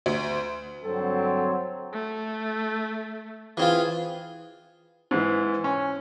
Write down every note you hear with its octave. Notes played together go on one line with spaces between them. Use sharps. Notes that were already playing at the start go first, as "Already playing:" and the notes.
D2
G2 D3 F#3 C4 A4
A3
E3 C4 F4 G#4
G#2 E3
C#4